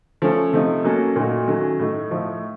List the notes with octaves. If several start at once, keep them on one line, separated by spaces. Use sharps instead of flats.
F3 A3 C#4 A4
C3 F3 A3 D#4
F#3 A#3 C#4 A4
A#2 A3 D#4 F#4
D#3 F#3 A3 C#4
A2 A3 D#4
A2 F3 A3 D#4